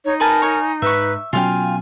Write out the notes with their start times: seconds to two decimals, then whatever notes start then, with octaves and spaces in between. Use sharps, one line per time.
0.05 D#4 C#5
0.20 A#4 B4 G#5 A5
0.42 C#5 G#5
0.82 G#2 B4 E5 C#6
1.33 B2 F#3 C#4 F4 F5 G5 G#5